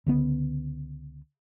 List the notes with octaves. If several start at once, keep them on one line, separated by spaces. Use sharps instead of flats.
C#2 D3 B3